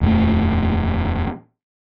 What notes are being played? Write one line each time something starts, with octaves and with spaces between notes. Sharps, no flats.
D#1 F2 F3 A3